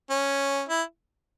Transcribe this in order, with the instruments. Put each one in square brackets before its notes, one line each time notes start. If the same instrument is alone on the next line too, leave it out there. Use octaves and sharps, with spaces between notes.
[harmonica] C#4
E4